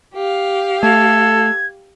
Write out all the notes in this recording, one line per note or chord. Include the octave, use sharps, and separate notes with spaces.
G4 F5
A3 A4 G#6